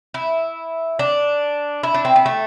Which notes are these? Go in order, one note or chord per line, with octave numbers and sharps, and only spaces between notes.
E4
D4
E4
D4
C4
B3
A3